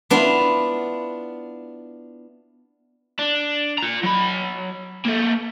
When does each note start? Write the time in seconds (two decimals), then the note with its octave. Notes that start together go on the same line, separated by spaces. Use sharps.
0.10 B3 D4 E4 F4
3.19 D4
3.78 F4 A#5
4.04 F#3 B5
5.06 A#3 A4